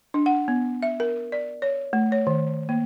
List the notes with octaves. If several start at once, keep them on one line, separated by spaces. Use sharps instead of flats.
D4
F#5
B3
E5
A#4
D5
C#5
A3
C#5
D#3
A#3